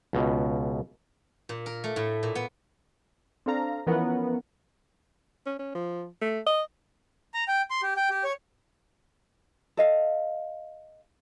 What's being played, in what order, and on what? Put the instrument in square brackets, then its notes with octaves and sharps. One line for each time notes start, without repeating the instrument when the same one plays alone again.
[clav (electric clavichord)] C#2 B2
[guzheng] A#2
A#4
A3
A2
A#2
B3
[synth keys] C4 D4 A4 F5 A#5
E3 F3 B3 C#4 A#4 F#5
[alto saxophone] C#4
C#4
F3
A3
D#5
[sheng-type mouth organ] A#5
G5
C6
G4
G5
G4
C#5
[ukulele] A4 D#5 F5